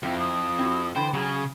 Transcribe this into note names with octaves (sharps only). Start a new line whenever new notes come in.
F2 F3 C4 E4 G5
D#6
C4 E4 F#4
D3 E3 C5 G5 B5
C#3 F#3 G#4